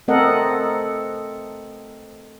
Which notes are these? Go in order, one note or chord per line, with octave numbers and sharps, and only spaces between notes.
A3 C4 A4 A#4 D#5 F#5